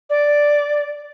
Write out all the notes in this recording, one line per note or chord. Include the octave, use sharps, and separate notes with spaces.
D5